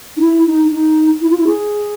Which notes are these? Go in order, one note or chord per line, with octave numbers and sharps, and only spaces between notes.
D#4
E4
D#4
D#4
E4
F4
E4
G#4